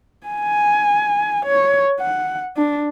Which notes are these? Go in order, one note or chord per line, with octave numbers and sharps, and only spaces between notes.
G#5
C#5
F#5
D4